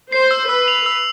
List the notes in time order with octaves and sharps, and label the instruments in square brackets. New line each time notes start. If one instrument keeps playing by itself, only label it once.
[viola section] C5 [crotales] C7
[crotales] E6
[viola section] B4 [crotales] E6
[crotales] F7
E6